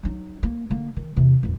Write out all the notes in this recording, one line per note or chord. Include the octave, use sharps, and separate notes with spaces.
F#3 D#4
A#3
D3 A#3
D#3
E2 C3
D#1 F2